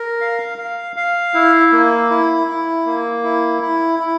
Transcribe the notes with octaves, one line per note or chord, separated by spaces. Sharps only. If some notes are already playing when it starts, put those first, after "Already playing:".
Already playing: A#4
F5
F5
F5
E4
A#3
E4
E4
A#3
E4
E4
E4